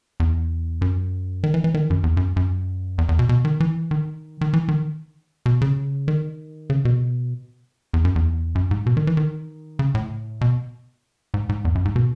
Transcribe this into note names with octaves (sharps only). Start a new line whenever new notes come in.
E2
F#2
D#3
E3
E3
D#3
F#2
E2
F#2
F#2
E2
E2
B2
B2
D#3
E3
D#3
D#3
E3
D#3
B2
C#3
D#3
C#3
B2
E2
F#2
E2
F#2
G#2
B2
D#3
E3
D#3
C#3
A2
B2
G#2
G#2
E2
F#2
G#2
B2